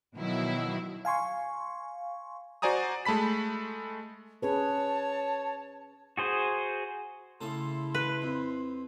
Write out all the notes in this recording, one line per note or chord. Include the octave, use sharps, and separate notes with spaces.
B2 D#3 F3 F#3 E4
F5 G#5 C6 C#6
F#4 C5 D5 G#5 A#5 D#6
G#3 A3 A5 B5 B6
C#4 G#4 B4 C#5 A5
F#4 G#4 C5
A2 C#3 E4 A4 C6
B4
F2